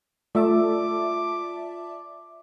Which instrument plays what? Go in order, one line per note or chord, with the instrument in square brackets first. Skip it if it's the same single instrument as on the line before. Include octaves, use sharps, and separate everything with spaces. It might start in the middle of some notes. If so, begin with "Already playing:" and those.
[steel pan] A3 [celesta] F4 [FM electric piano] D5 E5 A5 [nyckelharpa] D6